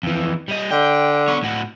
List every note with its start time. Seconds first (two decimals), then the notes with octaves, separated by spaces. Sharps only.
0.03 F2 E3
0.49 G3 D#5
0.71 D3 G5
1.28 B3 C#5
1.43 A2 F#4